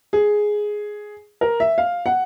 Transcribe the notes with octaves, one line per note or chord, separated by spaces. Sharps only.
G#4
A#4
E5
F5
F#5